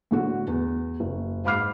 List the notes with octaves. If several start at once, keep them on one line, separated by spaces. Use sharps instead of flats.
A2 D3 F#4
E2
F#1
G#2 F5 B5 D6 F6 C7